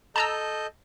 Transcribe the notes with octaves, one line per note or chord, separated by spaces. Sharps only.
A4 D#5 A5 A#5 E6 G6